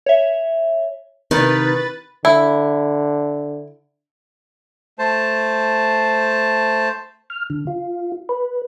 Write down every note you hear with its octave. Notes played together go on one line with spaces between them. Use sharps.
C#5 E5
C3 D#3 B4 A6
D3 E4
A3 C5 A5
F6
D3
F4
B4